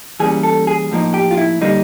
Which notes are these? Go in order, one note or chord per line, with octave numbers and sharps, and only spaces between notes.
E3 G3 A#3 C#4 G#4
A4
G#4
A2 F3 A#3 D#4
G4
F4
E4
D3 G3 A#3 D#4